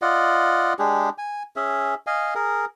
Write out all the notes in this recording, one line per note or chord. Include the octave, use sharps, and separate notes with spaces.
F4 D5 D#5 F#5
G#3 D4 G4 G#4
G#5
C#4 G#4 E5
D#5 F5 G#5
G#4 A#4